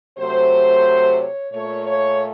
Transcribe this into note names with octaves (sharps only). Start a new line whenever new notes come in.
C3 F#3 A3 C5
C#5
A#2 A3 C#5
C#5